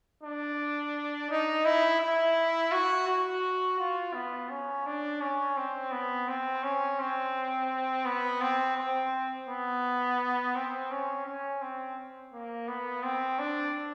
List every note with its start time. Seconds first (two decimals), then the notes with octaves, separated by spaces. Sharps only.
0.23 D4
1.30 D#4
1.65 E4
2.00 E4
2.72 F#4
3.08 F#4
3.79 F4
4.14 B3
4.50 C#4
4.86 D4
5.21 C#4
5.57 C4
5.92 B3
6.28 C4
6.64 C#4
7.00 C4
8.05 B3
8.41 C4
8.78 C4
9.49 B3
10.55 C4
10.91 C#4
11.26 C#4
11.62 C4
12.33 A#3
12.68 B3
13.03 C4
13.39 D4